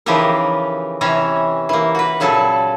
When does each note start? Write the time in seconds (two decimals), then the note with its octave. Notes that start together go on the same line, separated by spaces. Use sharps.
0.06 C#3 E3 F3 D#4 G4 A#4
1.01 C3 E3 C#4 E5 A#5
1.69 E3 A#3
1.95 F#4 B4
2.20 A#2 C#3 F#3 A4 A5